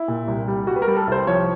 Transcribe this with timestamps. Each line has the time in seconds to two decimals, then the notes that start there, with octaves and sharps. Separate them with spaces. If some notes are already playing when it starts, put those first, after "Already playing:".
Already playing: E4
0.08 A#2
0.28 C2
0.48 G3
0.67 G3 F#4
0.76 B4
0.82 A#4
0.87 G3
0.97 A4
1.07 C2 C5
1.27 F3 C#5